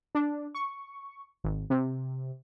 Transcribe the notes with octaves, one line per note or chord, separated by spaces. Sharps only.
D4
C#6
G#1
C3